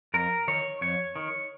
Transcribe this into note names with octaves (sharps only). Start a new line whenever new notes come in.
F2 A#4
D#3 C#5
F2 C#5
D#3